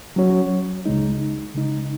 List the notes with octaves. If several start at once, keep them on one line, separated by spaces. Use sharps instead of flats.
F#3 C#4 F#4 C#5
C#2 C#3 G#3 D#4
C#3 G#3 D#4